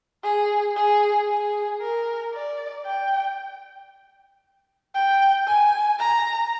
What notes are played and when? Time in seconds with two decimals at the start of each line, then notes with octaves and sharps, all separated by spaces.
0.24 G#4
0.76 G#4
1.28 G#4
1.81 A#4
2.33 D5
2.86 G5
4.95 G5
5.47 G#5
5.99 A#5